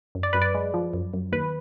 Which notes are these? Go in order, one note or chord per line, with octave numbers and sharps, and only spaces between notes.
F#2
D5
F#2 B4
D5
G#3
F3
F#2
F#2
D#2 B4